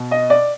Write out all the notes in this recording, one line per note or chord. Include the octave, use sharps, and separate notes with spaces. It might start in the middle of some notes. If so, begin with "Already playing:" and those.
Already playing: B2
D#5
D5